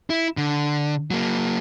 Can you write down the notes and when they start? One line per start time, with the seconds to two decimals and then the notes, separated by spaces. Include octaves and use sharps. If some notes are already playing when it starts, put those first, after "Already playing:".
0.10 E4
0.37 D3
1.11 F#3 A#3